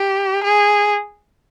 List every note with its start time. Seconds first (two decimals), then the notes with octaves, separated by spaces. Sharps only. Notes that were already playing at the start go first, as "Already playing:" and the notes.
Already playing: G4
0.43 G#4